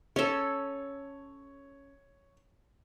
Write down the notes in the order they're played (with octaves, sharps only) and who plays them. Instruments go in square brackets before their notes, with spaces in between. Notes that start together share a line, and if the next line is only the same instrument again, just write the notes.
[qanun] C#4 A4 [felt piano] C#5